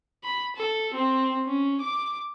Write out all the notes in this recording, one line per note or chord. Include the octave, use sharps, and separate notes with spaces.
B5
A4
C4
C#4
D6